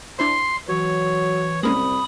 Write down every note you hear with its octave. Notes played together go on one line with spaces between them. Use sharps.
D4 E4 C5 C6
E3 F#3 C#5
C2 G#3 A#3 C#4 B5 D#6